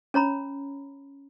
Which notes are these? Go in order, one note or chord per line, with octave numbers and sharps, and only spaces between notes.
C#4 C#5 A#5 B5